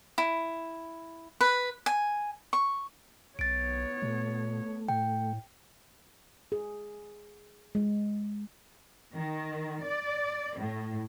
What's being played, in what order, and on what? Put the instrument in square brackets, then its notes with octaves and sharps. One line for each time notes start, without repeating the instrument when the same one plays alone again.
[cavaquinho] E4
B4
G#5
C#6
[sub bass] B1 [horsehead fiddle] B3 C#5 [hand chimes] A6 D7
[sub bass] A#2 [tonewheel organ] A3
[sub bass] A2 [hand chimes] G5
[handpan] G#4
G#3
[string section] D#3
D5
A2